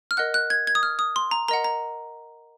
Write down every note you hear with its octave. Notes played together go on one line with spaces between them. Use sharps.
F6
A#4 D#5 F#5 F#6
F#6
G#6
G#6
D#6
F6
D#6
C6
A#5
A#4 D#5 F#5 A#5
A#5